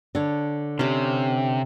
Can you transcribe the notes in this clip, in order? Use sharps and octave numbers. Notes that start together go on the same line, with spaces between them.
D3 D4 C#5
C3 C#4 G4 C#5